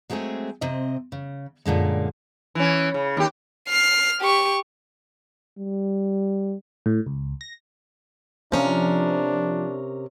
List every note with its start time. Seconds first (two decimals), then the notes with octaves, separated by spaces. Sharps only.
0.10 F#3 G#3 A3 C4 G#4
0.61 C3 C4 D#5
1.12 C#3
1.65 F#2 A#2 D3 G#3
2.55 E3 C#4
2.94 C#3
3.17 D#2 G4
3.69 F6 C7
4.21 G4 C#6
5.58 G3
6.86 A2
7.06 C#2
7.41 A#6
8.52 C3 F3 C#4 D4 A#4